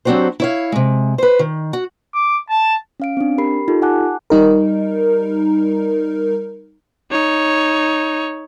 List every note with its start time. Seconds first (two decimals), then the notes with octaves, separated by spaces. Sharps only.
0.05 F#3 C4 D4 F#4 G4 C5
0.40 E4 C#5 F5
0.72 C3 G#3
1.18 B4 C5
1.39 D#3
1.73 F#4
2.14 D6
2.49 A5
3.00 C#4 F5 D7
3.17 C4 D4
3.38 G4 A#4 B5 C7
3.68 D#4 F4 G4 A4
3.82 F#5 G#5 A5 D6 F#6
4.30 G3 D#4 A#4
7.11 D#4 C#5